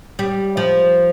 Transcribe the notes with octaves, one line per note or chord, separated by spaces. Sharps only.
G3
F3